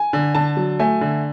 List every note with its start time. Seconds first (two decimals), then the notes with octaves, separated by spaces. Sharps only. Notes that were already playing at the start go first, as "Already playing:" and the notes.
Already playing: G#5
0.13 D3
0.35 D3 A5
0.57 F#3
0.79 A3 G#5
1.01 D3